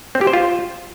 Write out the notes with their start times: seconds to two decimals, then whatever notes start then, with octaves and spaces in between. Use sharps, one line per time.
0.15 C4
0.21 G4
0.27 C5
0.33 F4